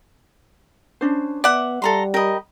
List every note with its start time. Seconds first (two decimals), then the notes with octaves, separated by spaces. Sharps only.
1.01 C#4 D4 C5
1.44 B3 D5 E5 F#5
1.82 G3 A4 A#5 C6
2.14 G4 A#4 D#5 B5